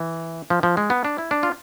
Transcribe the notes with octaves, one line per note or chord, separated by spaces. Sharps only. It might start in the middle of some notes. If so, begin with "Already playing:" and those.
Already playing: E3
F3
F3
G#3
B3
D4
E4
D4
F4